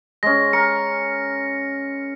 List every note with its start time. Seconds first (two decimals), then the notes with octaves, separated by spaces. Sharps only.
0.23 G#3 C#4 A#6
0.53 A#4 C#7